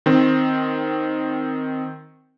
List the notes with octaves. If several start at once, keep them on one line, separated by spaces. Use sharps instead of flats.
D#3 C4